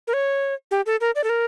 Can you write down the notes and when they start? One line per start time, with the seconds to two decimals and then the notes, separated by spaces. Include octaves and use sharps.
0.07 A#4
0.13 C#5
0.71 G4
0.86 A4
1.01 A#4
1.15 D5
1.24 A4
1.29 A#4